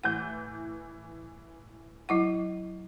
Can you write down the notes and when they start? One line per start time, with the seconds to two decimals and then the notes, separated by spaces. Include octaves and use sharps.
0.04 A2 E3 F#5 G6
2.09 F#3 E4 F#5